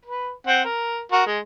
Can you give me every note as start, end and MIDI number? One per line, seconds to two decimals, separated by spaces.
0.05 0.31 71
0.47 0.62 60
0.47 0.62 78
0.65 1.01 70
1.12 1.24 66
1.12 1.24 70
1.27 1.39 56